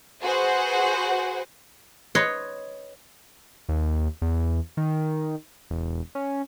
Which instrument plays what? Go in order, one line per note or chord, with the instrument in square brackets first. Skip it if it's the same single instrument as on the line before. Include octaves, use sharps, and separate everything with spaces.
[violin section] F#4 G#4 B4 C5 F#5
[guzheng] B4 C#5 D#5 C6
[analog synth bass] D#2
E2
D#3
E1
C#4